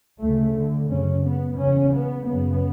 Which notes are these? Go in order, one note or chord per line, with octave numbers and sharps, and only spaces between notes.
D2 C#3 A3
D3
F#2 C#3 C#4
B3
E2 C#3 C#4
B3
F#2 C#3 B3